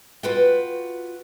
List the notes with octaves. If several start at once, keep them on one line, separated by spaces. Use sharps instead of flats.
F4 F#4 B4 F#5 G5